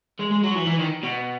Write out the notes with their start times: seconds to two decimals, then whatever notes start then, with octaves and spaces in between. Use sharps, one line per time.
0.19 G#3
0.31 G#3
0.43 F#3
0.55 E3
0.67 E3
0.79 D#3
1.03 B2